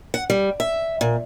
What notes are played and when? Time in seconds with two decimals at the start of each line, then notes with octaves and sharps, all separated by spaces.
0.14 F#5
0.30 G3
0.60 E5
1.01 A#2